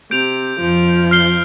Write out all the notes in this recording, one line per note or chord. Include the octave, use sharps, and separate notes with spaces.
C3 G6 D7 F7
F2 F3
F6 C7 G7